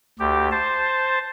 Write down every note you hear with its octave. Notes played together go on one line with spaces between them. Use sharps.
D2 G4
C5 A5